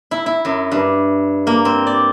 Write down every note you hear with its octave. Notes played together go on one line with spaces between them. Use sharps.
E4
E4
F#2
G2
A#3
C4
D5